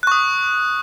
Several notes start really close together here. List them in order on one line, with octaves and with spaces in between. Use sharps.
F#6 C#6 D#6